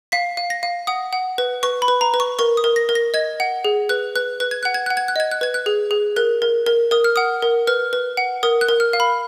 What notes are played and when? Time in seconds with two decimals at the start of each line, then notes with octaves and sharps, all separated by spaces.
0.12 F5 B6
0.37 F5
0.50 A#6
0.63 F5
0.87 F#5 D#6
1.13 F#5
1.38 B4
1.63 B4 C#6
1.82 B5
1.88 B4
2.01 A#5
2.14 B4
2.20 C#6
2.39 A#4 C#6
2.57 D#6
2.64 A#4
2.76 A#6
2.89 A#4
2.95 A#6
3.14 D#5 G#6
3.40 F#5
3.64 G#4
3.89 B4 F#6
4.16 B4 F#6
4.40 B4 F#6
4.51 G#6
4.63 F#5 F#6
4.74 G#6
4.86 F#5 F#6
4.97 G#6
5.08 F#6
5.16 D#5 G#6
5.31 F#6
5.41 B4 G#6
5.54 F#6
5.66 G#4
5.91 G#4
6.16 A#4 F#6
6.42 A#4
6.66 A#4
6.91 A#4 D#6
7.04 F6
7.16 F#5 D#6
7.42 A#4
7.67 B4 F6
7.93 B4
8.17 F#5
8.43 A#4 D#6
8.61 F#6
8.69 A#4
8.80 F6
8.93 F5
9.00 B5